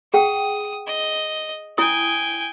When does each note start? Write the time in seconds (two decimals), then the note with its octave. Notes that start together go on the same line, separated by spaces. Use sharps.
0.14 G#4 F#5 G5 D#6
0.87 D#5
1.78 E4 G5 G#5 D#6